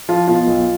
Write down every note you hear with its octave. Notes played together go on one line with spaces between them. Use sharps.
F3 F4
B2 F4
B1